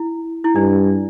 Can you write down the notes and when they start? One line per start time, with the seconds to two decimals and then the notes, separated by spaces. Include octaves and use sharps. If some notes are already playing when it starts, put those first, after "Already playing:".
Already playing: E4
0.44 E4
0.55 G2 D4